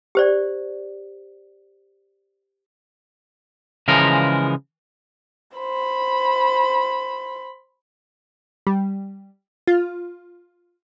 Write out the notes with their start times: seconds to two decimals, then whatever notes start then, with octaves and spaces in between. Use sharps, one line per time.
0.15 G4 C5 D5
3.88 C#3 E3 F3 G#3 A#4
5.56 C5 B5
8.67 G3
9.67 F4